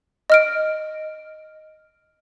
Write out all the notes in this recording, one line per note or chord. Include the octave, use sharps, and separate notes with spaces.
D#5 F6 D7